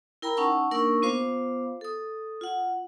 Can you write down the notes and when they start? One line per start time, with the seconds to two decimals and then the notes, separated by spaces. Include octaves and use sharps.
0.22 E4 A#4 G5 A#5 B5
0.37 C#4 D#4 F#5 A5 C#6 E6
0.71 A#3 D4 D#4 A#4 C#6 E6
1.02 B3 F4 C5 F5 D6
1.81 A4 D#6
2.41 F4 F#5